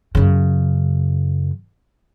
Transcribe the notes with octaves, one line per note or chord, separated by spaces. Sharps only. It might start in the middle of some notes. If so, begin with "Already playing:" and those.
F#2 C#3